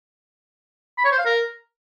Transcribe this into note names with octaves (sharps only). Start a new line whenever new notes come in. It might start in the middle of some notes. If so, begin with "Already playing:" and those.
B5
C#5
C5
F5
A#4